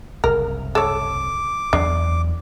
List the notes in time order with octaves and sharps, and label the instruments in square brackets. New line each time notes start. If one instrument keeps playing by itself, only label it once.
[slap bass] F#1 C2 [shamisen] A#4
[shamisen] A4 C#5 [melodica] D6
[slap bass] E2 F#3 B3 [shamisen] D4